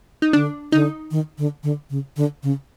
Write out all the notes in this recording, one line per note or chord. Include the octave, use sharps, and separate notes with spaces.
D#4
D3 D4
D3 D#4
D#3
D3
D3
C#3
D3
C#3